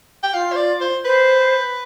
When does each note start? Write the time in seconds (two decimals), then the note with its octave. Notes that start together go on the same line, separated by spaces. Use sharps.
0.23 G5
0.34 F4 F5
0.52 C5
0.56 D5
0.81 C5
1.05 B4 C5